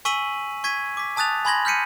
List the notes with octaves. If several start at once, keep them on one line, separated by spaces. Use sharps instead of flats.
G#5 C#6 E6 B6 D#7 F#7
C#6 G#6 B6 D#7
D6 B6
G#5 A5 D#6 F#6 A6 F7
G#5 B5 C6 G#6 A#6 F#7
F6 G6 B6 C#7 D#7